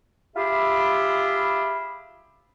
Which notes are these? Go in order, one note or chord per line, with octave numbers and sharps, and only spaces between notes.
F4 G4 G#4 E5 B5